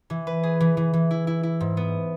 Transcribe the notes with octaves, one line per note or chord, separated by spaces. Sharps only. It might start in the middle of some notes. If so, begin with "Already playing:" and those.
E3
B4
G#4
E3
E3
E3
E4
E4
E4
G#2
B3